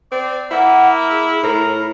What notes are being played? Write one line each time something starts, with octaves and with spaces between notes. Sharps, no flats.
C4 D5
A#3 E4 F#5
G#4
A2 E4 A#4